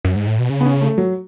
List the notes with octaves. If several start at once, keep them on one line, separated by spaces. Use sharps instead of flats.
F#2
G#2
A2
B2
C#3
B3
C#4
A3
F#3